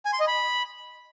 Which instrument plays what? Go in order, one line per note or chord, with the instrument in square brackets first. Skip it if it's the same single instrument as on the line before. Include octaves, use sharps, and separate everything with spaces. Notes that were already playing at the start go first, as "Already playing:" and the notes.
[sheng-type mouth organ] G#5
C6
D#5
B5